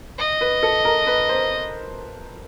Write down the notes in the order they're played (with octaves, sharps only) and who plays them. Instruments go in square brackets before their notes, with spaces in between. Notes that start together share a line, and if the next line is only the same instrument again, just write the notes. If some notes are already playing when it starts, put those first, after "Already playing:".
[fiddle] D#5
[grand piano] B4
A4
A#4
B4
C5